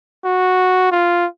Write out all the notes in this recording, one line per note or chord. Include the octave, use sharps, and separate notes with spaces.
F#4
F4